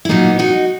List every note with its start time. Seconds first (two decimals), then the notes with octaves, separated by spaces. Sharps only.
0.05 E4
0.09 A#2 F#3 A#3 B3 D#4
0.39 D#4 F#4